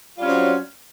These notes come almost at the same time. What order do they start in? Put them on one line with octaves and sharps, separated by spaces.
F4 G3 C#4 C4 F#3